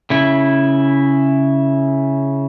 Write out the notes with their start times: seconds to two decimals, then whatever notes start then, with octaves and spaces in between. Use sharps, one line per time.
0.10 C#3 E4